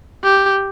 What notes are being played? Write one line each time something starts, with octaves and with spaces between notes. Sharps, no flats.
G4